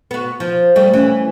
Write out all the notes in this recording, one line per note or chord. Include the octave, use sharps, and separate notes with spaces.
B3 F#4
F3
G3 A3
E3 C#4